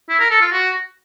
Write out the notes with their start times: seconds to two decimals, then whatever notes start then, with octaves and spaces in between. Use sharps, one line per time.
0.09 E4
0.20 A#4
0.30 A4
0.41 F4
0.52 F#4